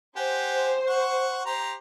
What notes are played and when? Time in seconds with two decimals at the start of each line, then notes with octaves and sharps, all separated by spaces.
0.16 G4 C5 F#5 G#5
0.87 F#5 C#6
1.46 G4 A#5 C6